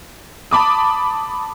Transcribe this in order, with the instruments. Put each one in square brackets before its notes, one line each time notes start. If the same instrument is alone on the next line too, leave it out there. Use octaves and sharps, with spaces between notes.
[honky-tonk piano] A5 B5 D6 D#6